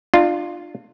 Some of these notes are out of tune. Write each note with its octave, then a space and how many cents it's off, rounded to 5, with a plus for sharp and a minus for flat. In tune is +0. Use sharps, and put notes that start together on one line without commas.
D4 +40 F4 +0